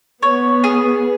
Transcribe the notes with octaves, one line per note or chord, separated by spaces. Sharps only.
B3 C#5
G#4